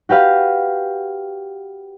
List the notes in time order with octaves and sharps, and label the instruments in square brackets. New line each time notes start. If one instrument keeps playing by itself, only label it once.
[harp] F#4 G4 B4 F5